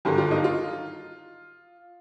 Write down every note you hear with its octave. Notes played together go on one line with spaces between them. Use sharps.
G#1 G2 D3 G4
F4
D#4
F4